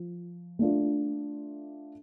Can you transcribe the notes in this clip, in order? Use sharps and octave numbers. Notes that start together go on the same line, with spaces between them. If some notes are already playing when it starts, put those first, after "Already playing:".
Already playing: F3
A3 D4 F4